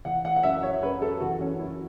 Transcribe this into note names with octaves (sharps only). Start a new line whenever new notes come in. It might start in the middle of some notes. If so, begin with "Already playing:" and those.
E3 F#5
F#5
F#5
F#2 E5
C#5
F#2 B4
A4
E3 F#4
C#4
F#2 E4